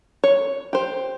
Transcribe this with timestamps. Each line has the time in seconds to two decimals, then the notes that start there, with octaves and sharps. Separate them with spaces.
0.24 C#5
0.73 G4 C5